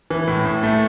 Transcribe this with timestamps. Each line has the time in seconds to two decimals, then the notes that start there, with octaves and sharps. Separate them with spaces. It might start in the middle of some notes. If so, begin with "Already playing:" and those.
0.10 E3
0.28 A2
0.45 A2
0.63 A3